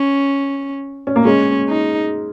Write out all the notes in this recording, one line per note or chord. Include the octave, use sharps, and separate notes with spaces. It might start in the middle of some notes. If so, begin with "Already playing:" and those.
Already playing: C#4
C#4
A#3
G#3 C#4
D#4